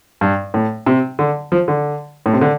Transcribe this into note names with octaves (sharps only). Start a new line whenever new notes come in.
G2
A2
C3
D3
F3
D3
A2
C3
D3